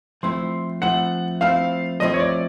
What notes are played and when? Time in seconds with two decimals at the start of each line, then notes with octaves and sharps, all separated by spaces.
0.23 F3 A3 C4 E4 C6
0.82 F3 A3 C4 E4 F#5
1.41 F3 A3 C4 E4 F5
2.00 F3 A3 C4 E4 D#5
2.14 C#5
2.20 D5